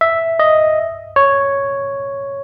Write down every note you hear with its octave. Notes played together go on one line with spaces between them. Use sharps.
E5
D#5
C#5